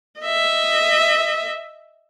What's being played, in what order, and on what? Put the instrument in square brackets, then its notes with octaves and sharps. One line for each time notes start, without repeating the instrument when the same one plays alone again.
[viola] D#5 E5